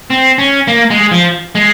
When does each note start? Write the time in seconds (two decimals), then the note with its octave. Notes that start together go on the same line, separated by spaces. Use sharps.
0.10 C4
0.38 C#4
0.68 A#3
0.90 G#3
1.12 F3
1.55 G#3